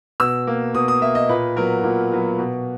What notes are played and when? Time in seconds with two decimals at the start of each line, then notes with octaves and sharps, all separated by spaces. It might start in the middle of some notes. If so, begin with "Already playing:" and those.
0.20 B2 E6
0.47 A#3
0.75 B2 D#6
0.88 D#6
1.02 A#3 E5
1.15 D#5
1.29 A#2 B4
1.56 F#3 B3 A#4
1.84 A#2
2.12 F#3 B3
2.38 B2